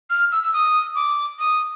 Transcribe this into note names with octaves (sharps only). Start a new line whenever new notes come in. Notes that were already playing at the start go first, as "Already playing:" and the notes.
F6
E6
E6
D#6
D6
D#6